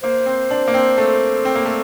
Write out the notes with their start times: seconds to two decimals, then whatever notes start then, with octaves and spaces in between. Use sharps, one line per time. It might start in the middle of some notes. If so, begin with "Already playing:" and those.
0.03 A#3 C5
0.26 C4
0.51 D4
0.68 A#3
0.74 C4
0.98 A3
1.45 C4
1.55 A#3
1.66 A3